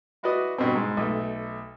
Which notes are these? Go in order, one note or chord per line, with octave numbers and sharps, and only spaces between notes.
E4 F#4 B4 D5 D#5 D#6
G2 B2 C4
G#2
B1 A3